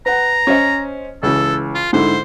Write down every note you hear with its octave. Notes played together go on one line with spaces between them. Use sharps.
B4 F#5 A#5
C#4 C5 D#5
C#2 E3 A4
F4
G#2 D3 E4 C5